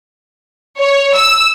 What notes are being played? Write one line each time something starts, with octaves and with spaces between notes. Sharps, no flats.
C#5
E6